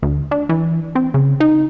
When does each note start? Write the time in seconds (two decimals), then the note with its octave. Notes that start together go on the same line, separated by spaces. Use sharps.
0.02 D2
0.31 D4
0.49 E3
0.95 C4
1.14 C#3
1.40 D#4